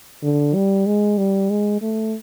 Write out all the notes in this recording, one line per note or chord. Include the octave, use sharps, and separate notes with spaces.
D3
G3
G#3
G3
G#3
A3